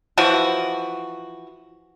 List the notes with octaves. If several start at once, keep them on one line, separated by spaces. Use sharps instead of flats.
E3 F3 F#4